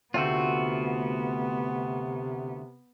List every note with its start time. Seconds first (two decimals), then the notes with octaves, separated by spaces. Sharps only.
0.14 D2 C3 A3 B3 C4 F4 F#4